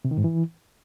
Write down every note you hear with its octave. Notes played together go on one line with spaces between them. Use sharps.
C3
D#3
G#2
E3